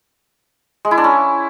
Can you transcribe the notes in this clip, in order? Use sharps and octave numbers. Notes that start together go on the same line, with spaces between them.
G#3
E4
D4
C#4